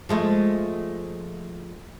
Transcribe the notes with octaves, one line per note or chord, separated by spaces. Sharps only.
F3 G#3 A3